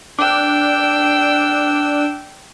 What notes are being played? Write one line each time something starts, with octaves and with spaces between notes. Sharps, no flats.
D4 G5 E6